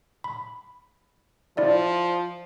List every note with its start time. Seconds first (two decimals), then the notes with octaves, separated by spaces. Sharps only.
0.24 B5
1.57 F3 E4 D5 E5